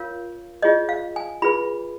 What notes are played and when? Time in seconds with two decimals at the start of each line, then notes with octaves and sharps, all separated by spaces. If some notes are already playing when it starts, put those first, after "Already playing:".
Already playing: F4 A#4 C#5 F5
0.62 F4 G#4 C#5 D#5
0.89 F5
1.16 G#5
1.42 F4 G#4 B4 B5